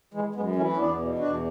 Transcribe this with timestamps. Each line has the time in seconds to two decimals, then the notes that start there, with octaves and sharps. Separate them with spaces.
0.14 E3 G#3
0.35 F#2 G#3 B3
0.55 E3 A3 C#4
0.73 C#4
0.76 E2 B3 D4
0.98 B2
1.19 E2 D4 F#4